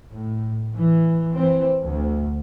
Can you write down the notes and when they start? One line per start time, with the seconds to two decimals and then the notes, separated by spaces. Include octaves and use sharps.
0.11 A2
0.73 E3
1.34 E3 C4
1.82 D2